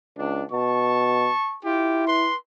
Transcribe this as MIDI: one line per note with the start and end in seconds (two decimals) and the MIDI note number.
0.19 0.43 37
0.19 0.43 62
0.52 1.28 47
0.52 1.56 81
0.52 1.56 85
1.65 2.29 64
1.65 2.05 65
1.65 2.05 67
2.07 2.35 71
2.07 2.35 84